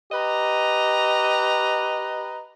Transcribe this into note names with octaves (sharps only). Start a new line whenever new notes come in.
G4 B4 D#5 A#5